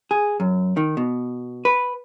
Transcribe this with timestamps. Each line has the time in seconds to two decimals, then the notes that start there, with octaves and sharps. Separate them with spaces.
0.11 G#4
0.40 F#2
0.77 D#3
0.97 B2
1.65 B4